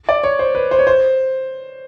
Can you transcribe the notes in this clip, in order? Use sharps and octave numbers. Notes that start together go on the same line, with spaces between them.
D5
C#5
C5
B4
C5
C#5
C5